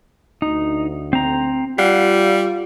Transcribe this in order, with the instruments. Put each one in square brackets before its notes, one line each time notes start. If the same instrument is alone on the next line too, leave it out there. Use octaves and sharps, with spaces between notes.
[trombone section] D2 [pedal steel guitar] D#4
[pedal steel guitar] C4 A#5
[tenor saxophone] G3 [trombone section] F4 [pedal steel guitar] F5 F#5